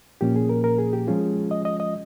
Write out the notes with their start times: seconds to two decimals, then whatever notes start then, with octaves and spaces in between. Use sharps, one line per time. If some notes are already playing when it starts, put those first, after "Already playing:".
0.21 A#2 F3 A#3 C#4 G4
0.36 G#4
0.49 A#4
0.64 A#4
0.78 G#4
0.93 G4
1.07 F3 G#3 C#4 F4 G#4
1.51 D#5
1.65 D#5
1.80 D#5